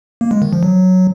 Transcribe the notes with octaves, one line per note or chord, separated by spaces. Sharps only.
A#3
G#3
D#3
F3
F#3